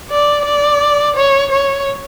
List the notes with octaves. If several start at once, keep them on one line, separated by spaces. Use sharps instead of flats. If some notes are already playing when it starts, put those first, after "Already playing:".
D5
D5
C#5
C#5